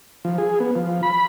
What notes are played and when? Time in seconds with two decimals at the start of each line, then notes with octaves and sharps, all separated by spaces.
0.25 F3
0.38 G#4
0.60 B3
0.75 F3
1.03 B5